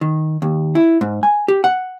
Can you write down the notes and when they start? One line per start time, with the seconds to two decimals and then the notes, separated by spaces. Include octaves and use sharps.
0.01 D#3
0.42 D#2
0.75 E4
1.01 G#2
1.23 G#5
1.48 G4
1.64 F#5